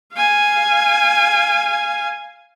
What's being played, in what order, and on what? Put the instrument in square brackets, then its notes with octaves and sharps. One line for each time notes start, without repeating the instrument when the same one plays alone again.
[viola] F5 G#5